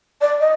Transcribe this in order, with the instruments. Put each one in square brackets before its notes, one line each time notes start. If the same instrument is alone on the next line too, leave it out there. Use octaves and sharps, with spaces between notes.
[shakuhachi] D5
D#5